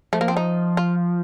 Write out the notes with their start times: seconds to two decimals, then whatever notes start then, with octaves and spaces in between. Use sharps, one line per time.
0.13 F3 A3
0.21 A#3
0.28 C4
0.37 D#4
0.77 F4